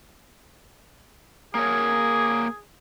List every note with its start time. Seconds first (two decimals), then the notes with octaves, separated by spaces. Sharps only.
1.55 A#3 G#4 A#4 C#5